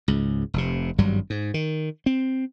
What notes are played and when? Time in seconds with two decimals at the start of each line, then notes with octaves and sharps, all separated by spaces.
0.08 C#2 G#2
0.54 F1 C3
0.98 G#1 G2 F#3 G3
1.30 G#2
1.54 D#3
2.06 C4